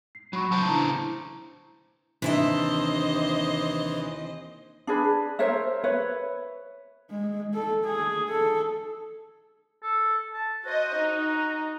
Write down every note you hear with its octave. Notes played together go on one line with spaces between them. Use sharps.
C7
F#3 B5 C#6
C#3 C5 A5
D4 E4 A#5
D#2 C3 E3 D4 C5 D#5 E5
D4 G#4 B4
A#4 C5 C#5 E5
B4 C#5 E5
G#3
A4
G#4
A4
A4
A5
F#4 C5 D#5
D#4